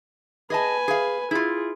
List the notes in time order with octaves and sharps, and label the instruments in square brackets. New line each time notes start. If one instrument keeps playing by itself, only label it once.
[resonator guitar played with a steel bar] G#4 D#5 A5 [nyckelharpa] B4 G#5
[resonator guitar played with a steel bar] G#4 F5
[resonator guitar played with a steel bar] E4 F4 [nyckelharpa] G#4